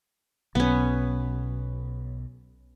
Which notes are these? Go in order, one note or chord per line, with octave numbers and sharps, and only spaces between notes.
B1 B3 C#4